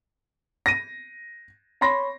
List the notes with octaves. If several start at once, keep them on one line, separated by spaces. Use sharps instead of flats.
A#6 D#7
C#5 B5 C6 A#6